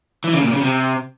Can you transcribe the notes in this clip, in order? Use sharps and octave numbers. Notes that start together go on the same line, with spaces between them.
E3
C#3
A#2
C#3
C3